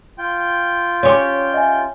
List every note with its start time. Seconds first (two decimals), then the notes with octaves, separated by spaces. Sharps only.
0.18 F4 G5
1.03 C#4 G4 C#5 C6 D6
1.54 D#5 E5 G#5